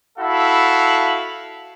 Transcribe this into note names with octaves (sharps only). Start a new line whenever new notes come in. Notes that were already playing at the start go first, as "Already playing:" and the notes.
E4 F#4 A4 F5 B5